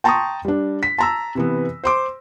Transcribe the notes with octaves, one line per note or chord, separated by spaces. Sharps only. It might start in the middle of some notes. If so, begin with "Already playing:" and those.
G5 A5 A#5 C6 C#6 D#6
G3 D4
B6
A5 A#5 E6
C3 E3 B3
C5 C6 D6